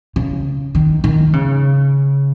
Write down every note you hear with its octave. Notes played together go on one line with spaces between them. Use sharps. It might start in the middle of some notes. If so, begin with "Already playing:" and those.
C#3
D#3
D#3
C#3